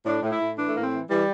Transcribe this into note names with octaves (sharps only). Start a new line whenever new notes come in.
A2 D4
A2
E4
A2
E3 D4
A3
A2 A#3
C4
E3
E3 G3